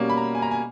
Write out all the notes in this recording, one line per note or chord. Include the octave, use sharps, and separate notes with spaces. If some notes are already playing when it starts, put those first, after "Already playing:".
Already playing: B2 G3 A#3 C#4
B5
A#5
G#5
A#5
G#5